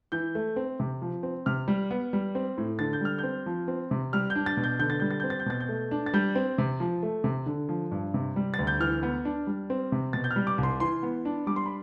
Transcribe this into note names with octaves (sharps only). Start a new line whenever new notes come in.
E3 G6
A3
C4
C3
F3
C4
C3 F6
G3
B3
G3
C4
A2
D3 A6
G6
G3 F6
C4 G6
F3
C4
C3
G3 F6
G6
D4
A6
B2
G6
D3 G6
A6
G3 G6
A6
C4 G6
A6
G6
B2 A6
G6
A3
D4
A6
G3 G6
C4
C3
F3
A3
C3
D3
F3
G2
C3
G3
A6
D2
G6
E3 F6
B3
D4
G3
C4
C3
B2 A6
G6
F6
G3
D6
C2
C6
E3 C6
B3
D4
G3 D6
C6
B5